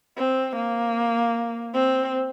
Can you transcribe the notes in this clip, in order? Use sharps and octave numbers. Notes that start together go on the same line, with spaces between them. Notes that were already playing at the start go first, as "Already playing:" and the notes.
C4
A#3
C4